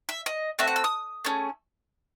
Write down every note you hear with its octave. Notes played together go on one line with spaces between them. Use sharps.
E5
D#5
A3 C4 F#4 E5
F#5
E6
D#6
A3 C#4 G#4